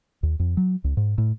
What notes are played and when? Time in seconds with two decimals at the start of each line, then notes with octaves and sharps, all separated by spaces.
0.23 D#2
0.40 F2
0.57 F#3
0.84 C#2
0.97 G#2
1.18 A2